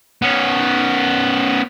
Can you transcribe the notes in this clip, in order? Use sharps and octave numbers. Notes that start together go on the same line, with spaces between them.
B3 C#4